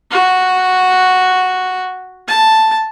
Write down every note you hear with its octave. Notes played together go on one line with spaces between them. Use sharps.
F#4
A5